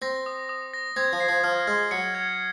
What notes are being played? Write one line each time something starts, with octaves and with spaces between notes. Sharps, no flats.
C4 A#6
D#6
D#6
A#6
C4 G#6
F3
C7
F3
F3 F6
G#3 F6
F#3 C#7
G#6